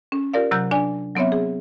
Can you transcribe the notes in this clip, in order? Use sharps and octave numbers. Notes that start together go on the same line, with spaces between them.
C#4
F4 G4 A#4 D5 F5
C3 F#3 A#5 F#6 G6
D4 D5 G#5
F#3 B3 C4 C#5 E5
G#4